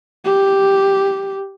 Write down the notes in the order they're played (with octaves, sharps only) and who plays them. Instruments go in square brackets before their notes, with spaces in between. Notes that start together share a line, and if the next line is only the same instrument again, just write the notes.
[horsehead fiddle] G4